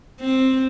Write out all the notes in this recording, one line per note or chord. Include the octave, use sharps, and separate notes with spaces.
C4